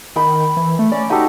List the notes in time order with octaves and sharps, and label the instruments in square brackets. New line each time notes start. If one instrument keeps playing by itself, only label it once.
[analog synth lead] D#3 [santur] G5 B5
[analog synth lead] E3
A3
[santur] C#4 [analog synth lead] D5
[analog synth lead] D#4 [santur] F#4 G4 A4